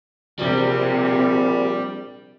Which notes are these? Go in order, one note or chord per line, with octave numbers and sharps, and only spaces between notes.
A#1 C3 G3